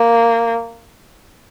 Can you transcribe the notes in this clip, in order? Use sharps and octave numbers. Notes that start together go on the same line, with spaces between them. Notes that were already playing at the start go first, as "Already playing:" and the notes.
Already playing: A#3